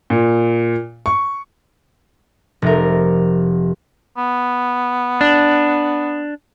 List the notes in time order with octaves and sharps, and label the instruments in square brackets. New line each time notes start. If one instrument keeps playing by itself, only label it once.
[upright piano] A#2
C#6
[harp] F1 A#4
[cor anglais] B3
[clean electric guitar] D4